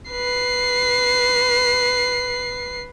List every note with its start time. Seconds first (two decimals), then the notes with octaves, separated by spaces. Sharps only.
0.11 B4 C7